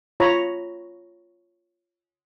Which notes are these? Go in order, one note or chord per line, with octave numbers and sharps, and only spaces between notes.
F4 C#5 A#5 B5